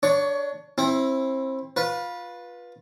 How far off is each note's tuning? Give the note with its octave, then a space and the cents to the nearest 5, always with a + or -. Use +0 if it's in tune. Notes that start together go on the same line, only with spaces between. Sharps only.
D4 +0 C#5 +25 C#6 +15
C4 +30 E4 +0
F4 +15 B4 -15